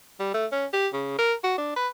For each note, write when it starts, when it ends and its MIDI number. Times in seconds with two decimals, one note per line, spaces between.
0.20 0.34 55
0.34 0.46 57
0.52 0.66 61
0.73 0.88 67
0.94 1.14 49
1.19 1.34 70
1.44 1.55 66
1.58 1.72 62
1.77 1.88 71